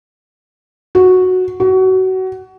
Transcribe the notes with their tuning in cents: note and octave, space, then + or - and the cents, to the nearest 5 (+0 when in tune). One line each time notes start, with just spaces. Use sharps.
F#4 -5
F#4 +25